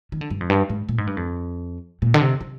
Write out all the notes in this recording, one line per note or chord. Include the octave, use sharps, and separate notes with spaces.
D#3
D3
G2
F2
G2
G#2
A#2
G#2
G2
F2
A#2
D3
C3
C3